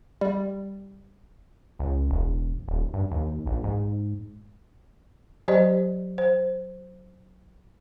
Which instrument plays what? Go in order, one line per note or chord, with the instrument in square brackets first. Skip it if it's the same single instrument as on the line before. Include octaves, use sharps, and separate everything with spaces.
[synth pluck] G3
[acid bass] C#2
E1
D#1
G2
D#2
A#1
G#2
[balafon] F#3 G4 C5 D5 D#5
C5